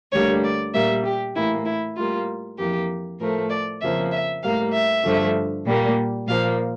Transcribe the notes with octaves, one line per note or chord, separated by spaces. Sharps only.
D2 D3 G3 A#3 C#5
D5
A#2 G3 A#3 E5
G4
A2 E3 A#3 E4
E4
A2 G3 A#3 F4
F2 E3 A#3 G4
A2 F3 A3 A#4
D5
F2 C#3 F3 A#3 E5
E5
A2 G3 A#3 F5
E5
G2 D3 F3 A3
A#2 G3 A#3
A#2 F3 A#3 F5